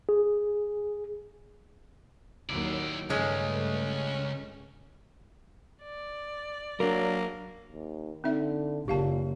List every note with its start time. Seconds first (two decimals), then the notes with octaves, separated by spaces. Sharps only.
0.09 G#4
2.49 D#2 D#3 F#3 E4 D5
3.10 C#2 G2 G#3 A3 C#4
5.83 D5
6.80 F#3 A#3 D4 A#4
7.72 D#2
8.24 D3 C4 D#4 E5
8.88 F#1 A#2 G4 F5 A5